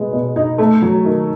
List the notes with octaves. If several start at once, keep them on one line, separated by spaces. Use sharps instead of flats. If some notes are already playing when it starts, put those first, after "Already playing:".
Already playing: B2 G#3 B3
B2
D#4
A3
F#3
D#3